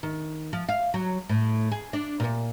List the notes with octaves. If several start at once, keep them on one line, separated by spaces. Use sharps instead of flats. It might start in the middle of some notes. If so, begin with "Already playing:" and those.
D#3
F3
F5
F#3
A2
G#4
D4
A#2